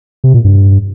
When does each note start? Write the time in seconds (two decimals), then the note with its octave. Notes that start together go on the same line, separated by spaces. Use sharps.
0.24 C3
0.34 A#2
0.44 G2